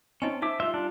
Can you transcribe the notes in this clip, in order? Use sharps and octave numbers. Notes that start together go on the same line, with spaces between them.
C4 C#4 D#4 D#5 G#5
D#4 C5 E5 D6
G3 F4 E5 C6
D4